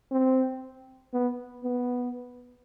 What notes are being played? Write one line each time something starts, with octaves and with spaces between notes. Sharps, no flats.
C4
B3
B3